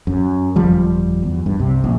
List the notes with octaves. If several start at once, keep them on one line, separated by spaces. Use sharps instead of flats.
F#2
G1 F2 F3 G3
E2
G2
C2 C3
A#1